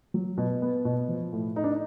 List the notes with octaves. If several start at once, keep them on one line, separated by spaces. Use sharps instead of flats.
F#3
B2
B3
B2
F3
A2
A3 D#4
D4
D#4